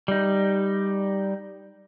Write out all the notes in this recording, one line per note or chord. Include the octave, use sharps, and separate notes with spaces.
G3 D#4